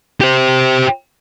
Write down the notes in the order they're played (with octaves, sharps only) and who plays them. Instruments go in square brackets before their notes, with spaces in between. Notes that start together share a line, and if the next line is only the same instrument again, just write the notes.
[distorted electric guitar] G4 C5